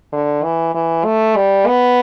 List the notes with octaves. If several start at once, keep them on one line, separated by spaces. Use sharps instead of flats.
D3
E3
E3
A3
G3
B3